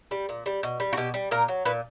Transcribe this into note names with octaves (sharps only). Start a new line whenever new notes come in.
G3
A#2
G3
B2
G3
F#4
B2 G4
G3
A#2 A#4
F#3
A#2 B4